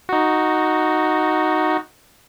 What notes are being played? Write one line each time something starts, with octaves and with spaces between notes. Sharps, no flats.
D#4 F#4